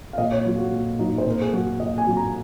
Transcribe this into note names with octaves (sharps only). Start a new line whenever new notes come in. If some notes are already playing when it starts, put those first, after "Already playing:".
F5
A#2 D#5
C#5
F#3 F4
F#4
A#2
F#3 D#4
C5
A#2 A#4
G#4
F#3 F#4
A#2 D#5
G#5
F#3
A#5